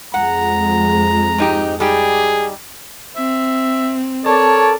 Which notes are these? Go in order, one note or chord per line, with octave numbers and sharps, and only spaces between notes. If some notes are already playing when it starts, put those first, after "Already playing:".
F2 G#3 F#5 A#5
G#2 D#4 G4
G3 D#4 G4 G#4
C4 E5
A4 A#4 C#5 D5 A5